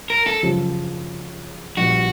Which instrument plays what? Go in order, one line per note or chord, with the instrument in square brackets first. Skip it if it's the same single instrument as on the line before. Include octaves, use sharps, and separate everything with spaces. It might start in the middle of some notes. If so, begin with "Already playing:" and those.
[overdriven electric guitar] A#4
A4
[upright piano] F#2 C#3 F3
[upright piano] A#1 A#2 G3 B3 [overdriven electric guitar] F#4